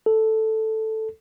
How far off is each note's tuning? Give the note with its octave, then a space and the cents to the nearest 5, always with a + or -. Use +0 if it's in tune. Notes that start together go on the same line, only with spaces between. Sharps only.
A4 +0